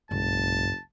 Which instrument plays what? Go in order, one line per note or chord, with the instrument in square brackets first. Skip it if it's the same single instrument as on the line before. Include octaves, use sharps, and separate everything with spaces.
[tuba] F#1 [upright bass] B1 G#3 [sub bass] G2 [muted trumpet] A5